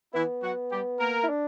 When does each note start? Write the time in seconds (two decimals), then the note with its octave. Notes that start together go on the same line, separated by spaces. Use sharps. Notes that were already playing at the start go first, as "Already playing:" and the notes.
0.14 E3 B3 E4
0.43 F#3 F#4
0.71 G3 G4
1.00 A#3 A#4
1.24 E4
1.29 D4